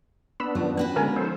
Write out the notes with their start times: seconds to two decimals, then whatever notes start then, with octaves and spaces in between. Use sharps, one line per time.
0.40 B3 D4 B5 E6
0.55 F#2 D#3 G3 F4 C5
0.77 A#3 C#4 F#4 B4
0.96 D3 G#3 B3 G#4 A#4 G#5 A#5
1.16 F3 D#4 A4 C5